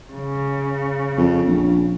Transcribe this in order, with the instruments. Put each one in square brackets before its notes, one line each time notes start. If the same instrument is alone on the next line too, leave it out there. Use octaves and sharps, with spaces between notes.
[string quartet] C#3
[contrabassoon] F2
A#1